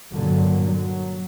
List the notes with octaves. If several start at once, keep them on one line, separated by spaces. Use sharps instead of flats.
G2 A#2 D3 F#3
F#3